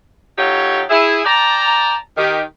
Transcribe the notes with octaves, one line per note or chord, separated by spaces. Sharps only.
F#3 D#4 F4 G4 A4 C#5
E4 G#4
D5 G5 A5 A#5
D#3 G4